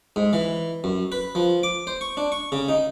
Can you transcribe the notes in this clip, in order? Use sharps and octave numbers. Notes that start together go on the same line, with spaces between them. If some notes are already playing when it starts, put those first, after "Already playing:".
G#2
E3
F#2
B4
F3
D6
C5
C#6
D4
C#6
C#3
D#4